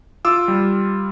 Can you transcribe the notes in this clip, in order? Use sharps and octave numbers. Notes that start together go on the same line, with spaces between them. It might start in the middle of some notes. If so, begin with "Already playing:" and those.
F4 D6 E6
G3